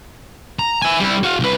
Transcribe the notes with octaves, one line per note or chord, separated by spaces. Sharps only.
A#5
E5 G#5
G3 E4
F#4 F5
C2 B4